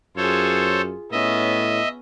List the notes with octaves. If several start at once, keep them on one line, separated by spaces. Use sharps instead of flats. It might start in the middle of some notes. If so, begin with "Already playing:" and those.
F#2 F4 G#4 A4 C5 C#5
A2 B3 C#4 D#5 E5